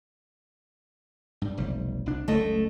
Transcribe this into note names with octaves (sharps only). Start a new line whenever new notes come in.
G2 G3
F1 B1 G3
C2 D4
F#1 C#2 D3 A3 D#5